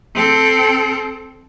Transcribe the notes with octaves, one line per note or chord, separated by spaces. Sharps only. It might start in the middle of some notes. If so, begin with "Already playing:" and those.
C4 A4